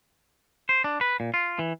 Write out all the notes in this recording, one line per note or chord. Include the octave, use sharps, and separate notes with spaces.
C5
D4
B4
A#2
F4
E3